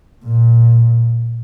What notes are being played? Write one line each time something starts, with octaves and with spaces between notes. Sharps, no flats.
A#2